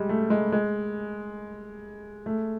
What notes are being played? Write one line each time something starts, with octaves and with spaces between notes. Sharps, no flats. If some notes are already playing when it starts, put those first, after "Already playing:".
Already playing: G3 G#3
A3
G#3
G#3
A3